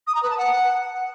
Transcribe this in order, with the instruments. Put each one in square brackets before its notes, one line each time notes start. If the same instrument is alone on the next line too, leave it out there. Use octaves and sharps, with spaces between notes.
[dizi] D#6
A#5
B4
A5
F#5